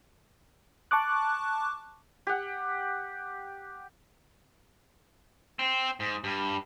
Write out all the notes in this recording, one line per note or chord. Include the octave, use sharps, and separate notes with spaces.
A5 C#6 D6 F#6
G4 F#5
C4
G#2
G2